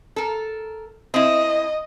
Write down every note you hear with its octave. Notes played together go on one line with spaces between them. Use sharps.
A4 A#4
C4 E4 D#5